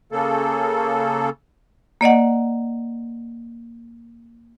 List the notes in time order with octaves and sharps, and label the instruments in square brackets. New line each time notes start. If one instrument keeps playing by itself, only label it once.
[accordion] C#3 A#3 A4
[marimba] A#3 D5 D#5 F#5